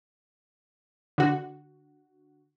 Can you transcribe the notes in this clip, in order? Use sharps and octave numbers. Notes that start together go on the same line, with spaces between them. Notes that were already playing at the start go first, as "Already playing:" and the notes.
D3 F#4